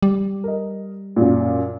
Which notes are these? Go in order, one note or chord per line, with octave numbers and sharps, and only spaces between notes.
G3
A#4 D#5
F#2 A#2